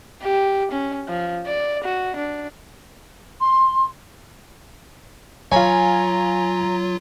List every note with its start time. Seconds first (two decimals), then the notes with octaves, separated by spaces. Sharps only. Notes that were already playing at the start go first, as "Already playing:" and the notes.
0.23 G4
0.71 C#4
1.08 F3
1.46 D5
1.83 F#4
2.16 D4
3.40 C6
5.52 F#3 F4 C#5 F5 G#5 A#5 B5